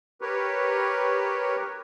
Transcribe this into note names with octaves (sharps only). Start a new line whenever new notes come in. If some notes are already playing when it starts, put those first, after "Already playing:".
G4 A#4 B4 C#5